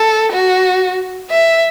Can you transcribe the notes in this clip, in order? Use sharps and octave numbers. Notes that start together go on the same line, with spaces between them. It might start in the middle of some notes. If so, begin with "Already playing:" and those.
Already playing: A4
F#4
E5